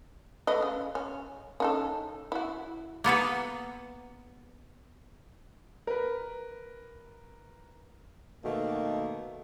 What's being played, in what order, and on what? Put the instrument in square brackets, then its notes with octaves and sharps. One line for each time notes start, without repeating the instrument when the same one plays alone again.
[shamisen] A3 B4 D#5
C#3
C#4
C#4 D#4 A4
E4 F#4
[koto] A#3 B3 A4 B4
[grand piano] A#4 B4
[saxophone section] B2 D#3 A3 A#3